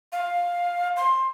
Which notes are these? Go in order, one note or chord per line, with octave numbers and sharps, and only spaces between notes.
F5
C6